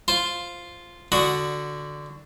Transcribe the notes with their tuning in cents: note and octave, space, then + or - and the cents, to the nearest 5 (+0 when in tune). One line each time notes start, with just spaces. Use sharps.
F4 +0 C5 +0
D3 +0 F#4 +0 D#6 +0